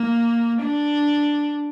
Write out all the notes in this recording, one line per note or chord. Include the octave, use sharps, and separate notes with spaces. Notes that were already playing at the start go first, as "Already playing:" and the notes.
Already playing: A#3
D4